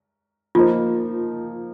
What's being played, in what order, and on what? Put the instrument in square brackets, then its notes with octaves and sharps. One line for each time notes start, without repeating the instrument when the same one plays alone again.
[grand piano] F3 A#3 D#4 C5 [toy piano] F4